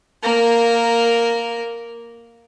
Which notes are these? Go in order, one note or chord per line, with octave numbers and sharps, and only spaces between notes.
A#3 A#4